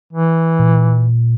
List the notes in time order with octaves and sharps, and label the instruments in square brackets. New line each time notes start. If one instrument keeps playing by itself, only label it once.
[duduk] E3
[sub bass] A#2